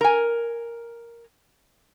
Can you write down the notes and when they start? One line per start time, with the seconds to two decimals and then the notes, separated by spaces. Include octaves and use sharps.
0.01 A#4 G#5